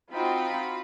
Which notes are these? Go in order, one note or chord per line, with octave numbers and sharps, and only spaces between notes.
C4 D#4 F4 F#4 G5 B5